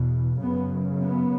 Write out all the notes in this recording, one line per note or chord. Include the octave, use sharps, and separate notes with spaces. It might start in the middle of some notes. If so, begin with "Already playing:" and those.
Already playing: E2 B2
F#2 C#3 B3
B3